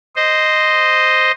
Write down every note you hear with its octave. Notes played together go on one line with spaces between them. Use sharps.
C5 D#5